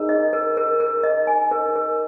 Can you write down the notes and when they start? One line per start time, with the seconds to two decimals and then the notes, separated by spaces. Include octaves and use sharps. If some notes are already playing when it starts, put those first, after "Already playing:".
Already playing: D#4 G#4 A#4
0.09 D#5
0.33 A#4
0.57 A#4
0.80 A#4
1.03 D#5
1.27 G#5
1.51 A#4
1.75 A#4